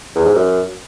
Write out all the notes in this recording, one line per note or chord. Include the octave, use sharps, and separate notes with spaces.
E2
G#2
F#2